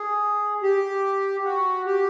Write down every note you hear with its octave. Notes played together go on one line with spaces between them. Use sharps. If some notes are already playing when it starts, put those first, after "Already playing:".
Already playing: G#4
G4
F#4
G4